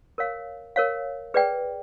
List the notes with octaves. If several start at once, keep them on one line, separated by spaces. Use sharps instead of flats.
A#4 C#5 F5
A#4 C#5 F5
G#4 B4 D5 G5